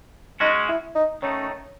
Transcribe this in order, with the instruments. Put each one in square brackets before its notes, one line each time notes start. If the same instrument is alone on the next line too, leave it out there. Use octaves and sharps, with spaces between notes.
[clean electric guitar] G#3 C#4 F#4 [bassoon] D#4
[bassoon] E4
D#4
[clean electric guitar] D#3 A3 D#4 [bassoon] C#4